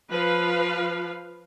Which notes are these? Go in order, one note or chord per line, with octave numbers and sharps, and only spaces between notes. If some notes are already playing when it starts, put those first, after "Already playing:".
F3 B4 F5